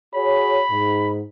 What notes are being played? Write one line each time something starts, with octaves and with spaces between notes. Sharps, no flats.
F#4 G#4 C#5 B5
G#2